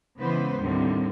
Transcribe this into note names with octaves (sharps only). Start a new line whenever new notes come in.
C#3 E3 G#3 B3 B4 C5
D#2 A2 D3 G3 C4